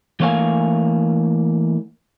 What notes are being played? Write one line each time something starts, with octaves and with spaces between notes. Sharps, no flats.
E3 A3 A#3 C#5 F5 G#5